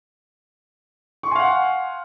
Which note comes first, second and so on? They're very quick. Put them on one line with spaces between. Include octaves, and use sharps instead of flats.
C#6 C6 G#5 F5 F#5